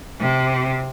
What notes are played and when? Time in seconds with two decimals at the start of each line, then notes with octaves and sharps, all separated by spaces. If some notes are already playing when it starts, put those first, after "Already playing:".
0.20 C3